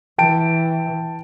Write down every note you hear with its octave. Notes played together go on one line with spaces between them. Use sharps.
E3 G5 A5 D7